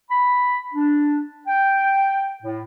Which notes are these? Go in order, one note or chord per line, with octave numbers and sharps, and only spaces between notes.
B5
D4
G5
A2